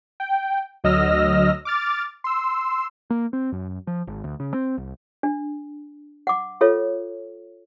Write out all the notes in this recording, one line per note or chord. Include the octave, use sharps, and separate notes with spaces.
G5
D2 F#3 D#5 E6 F6 A#6
D6 F6 A6
C6 E6
A#3
C4
F#2
F3
G#1
D2
C#3
C4
C2
D4
F#5 D6
F4 A4 C#5 E5